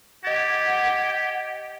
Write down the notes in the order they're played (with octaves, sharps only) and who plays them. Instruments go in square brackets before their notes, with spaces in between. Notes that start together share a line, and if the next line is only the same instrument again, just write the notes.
[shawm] G4 [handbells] D#5 A6 [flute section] F#5 G#6